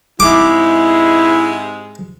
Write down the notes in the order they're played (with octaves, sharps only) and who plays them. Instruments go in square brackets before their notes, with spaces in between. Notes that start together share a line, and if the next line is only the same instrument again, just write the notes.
[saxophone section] G#2 C3 G#3 [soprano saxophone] E4 [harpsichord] D6